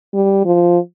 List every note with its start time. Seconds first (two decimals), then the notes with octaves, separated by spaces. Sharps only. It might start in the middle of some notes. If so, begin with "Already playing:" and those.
0.14 G3
0.45 F3